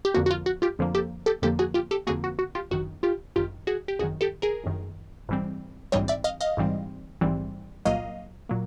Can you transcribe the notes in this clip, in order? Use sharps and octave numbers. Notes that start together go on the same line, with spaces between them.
G4
F2 D3 F3 A#3 F#4
F#4
F4
F#4
F4 G4
F2 D3 F3 A#3
G4 A4
G4 A4
F2 D3 F3 A#3 G4 A4
F#4 G#4
F4 G4
G4 A4
F2 D3 F3 A#3 F#4 G#4
F#4
F#4
F4 G4
G1 F#2 D#3 F#4
F4 G4
G1 F#2 D#3 F4 G4
F#4 G#4
G4
G1 F#2 D#3 F#4 G#4
G4 A4
G#4 A#4
G1 F#2 D#3
A#1 G#2 E3 G3 C4
A#1 G#2 E3 G3 C4 C#5 D#5
D5 E5
D#5 F5
D#5 F5
A#1 G#2 E3 G3 C4
A#1 G#2 E3 G3 C4
C2 A#2 F#3 A#3 D#5 F5
A#2 F#3 A#3